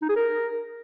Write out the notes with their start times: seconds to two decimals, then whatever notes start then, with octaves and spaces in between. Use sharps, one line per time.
0.02 D#4
0.09 G#4
0.17 A#4